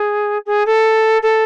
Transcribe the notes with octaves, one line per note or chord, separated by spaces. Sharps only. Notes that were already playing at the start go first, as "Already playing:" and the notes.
Already playing: G#4
G#4
A4
A4